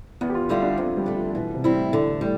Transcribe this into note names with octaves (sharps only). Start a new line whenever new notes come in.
E2 B3
G4
F4
D3 G3 B3 E4 F4
D4
F2 C4
G3
D3 A3
F3
B2 E3
C3
G3 C4 E4
A2
A2 D3
A2 G3